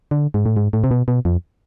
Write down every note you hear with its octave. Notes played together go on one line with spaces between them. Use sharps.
D3
G#2
A2
G#2
A2
C3
B2
B2
F2